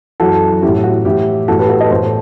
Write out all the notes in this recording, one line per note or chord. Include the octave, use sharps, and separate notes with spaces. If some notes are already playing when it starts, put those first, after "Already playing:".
F#2 E3 F#4 A4
E3 E4 G4
A2
F#4
A2 E3 E4 G4
A2 E3 F#4 A4
G4 B4
F#4 A4
B4 D#5
A2 E3 A4 C5